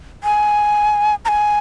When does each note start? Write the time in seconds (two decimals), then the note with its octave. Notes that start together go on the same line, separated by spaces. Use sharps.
0.24 G#5
1.25 A#5
1.28 G#5